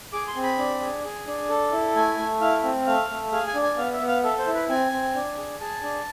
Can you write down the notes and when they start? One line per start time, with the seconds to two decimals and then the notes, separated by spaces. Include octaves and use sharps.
0.13 G#4 D6
0.27 C6
0.36 C4
0.43 B5
0.59 D4
0.81 G#4
1.04 G#4
1.27 D4
1.49 A4
1.72 E4
1.95 A3 G#5
2.18 A3
2.41 E4 F5
2.64 C4
2.86 A3 F5
3.09 A3
3.32 G#4 F5
3.47 G#5
3.55 D4
3.63 G#5
3.77 B3 F5
3.93 E5
4.01 B3
4.08 F5
4.23 A4 E5
4.39 C5
4.47 E4
4.54 B4
4.69 C4 G#5
4.92 C4
5.15 D4
5.37 G#4
5.60 G#4 A5
5.83 D4